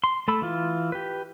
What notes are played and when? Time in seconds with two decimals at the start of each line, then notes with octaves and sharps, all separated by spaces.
0.04 C6
0.28 A3 A4 B5 E6
0.42 E3 F4
0.92 G4 B4